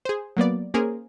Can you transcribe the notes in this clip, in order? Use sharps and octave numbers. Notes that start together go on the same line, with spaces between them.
G#4 C5
F#3 A#3 B3 D5
A#3 C#4 G#4 A#4 C5